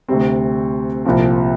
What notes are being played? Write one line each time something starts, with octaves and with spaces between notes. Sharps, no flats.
D2 C3 G3 C4
C2 A#2 F3 C4